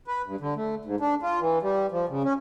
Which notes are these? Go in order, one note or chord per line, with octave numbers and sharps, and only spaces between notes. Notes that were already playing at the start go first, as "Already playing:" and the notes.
B4
G2
D3
A3
G#2
D4
F4
E3
G3
F3
C#3
C#4